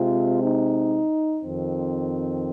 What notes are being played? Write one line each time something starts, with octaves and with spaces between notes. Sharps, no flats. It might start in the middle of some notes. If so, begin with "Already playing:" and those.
Already playing: C3 G#3 C4 F4
D#4
F2 D#3 C4